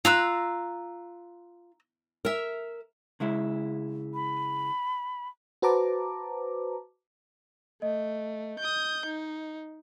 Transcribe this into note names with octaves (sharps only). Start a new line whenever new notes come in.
F4 A#5 E6 F#6
A#4 E5
C#3 G#3 E4
B5
F#4 B4 C5 A5 A#5 D6
A3 D#5
D#6 G6
D#4